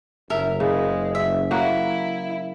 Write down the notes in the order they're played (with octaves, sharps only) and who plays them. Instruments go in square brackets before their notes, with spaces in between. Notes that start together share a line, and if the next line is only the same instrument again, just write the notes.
[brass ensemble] F#1 [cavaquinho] A#4 E5
[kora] C#3 [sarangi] G#3
[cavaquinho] E5
[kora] F#3 A#3 F#4 [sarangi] E4